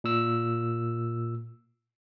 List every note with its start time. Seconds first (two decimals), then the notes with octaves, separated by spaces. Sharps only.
0.04 A#2 E6